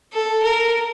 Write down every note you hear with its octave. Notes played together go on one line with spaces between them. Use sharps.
A4
A#4